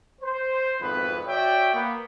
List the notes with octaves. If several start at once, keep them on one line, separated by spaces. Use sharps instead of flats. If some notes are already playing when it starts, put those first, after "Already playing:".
C5
G#1 F2 B3 B4
F#4 C#5 D5 E5 G5
A#3 B3